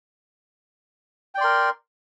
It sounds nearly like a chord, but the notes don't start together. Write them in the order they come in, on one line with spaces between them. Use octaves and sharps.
G5 D5 C6 A#4